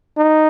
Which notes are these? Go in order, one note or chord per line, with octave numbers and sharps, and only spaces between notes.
D#4